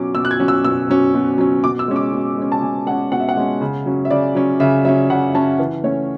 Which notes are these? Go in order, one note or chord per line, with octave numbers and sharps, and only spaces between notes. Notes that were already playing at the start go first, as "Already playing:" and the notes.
Already playing: B2 F#3 C#4 D6
B2 E6
F#6
G#6
F#3 C#4
E6
B2 E6
F#3 C#4
B2
F#3 C#4
B2 D6
E6
G#3 C#4
D6
B2
G#3 C#4
A5
B2 G#5
G#3 C#4 F#5
B2 F#5
E5
F#5
G#3 C#4
C#3
F#3 C#4
E5
C#3 D5
F#3 C#4
C#3 E5
F#3 C#4 E5
C#3 F#5
F#3 C#4 A5
E3
A3 C#4 C#5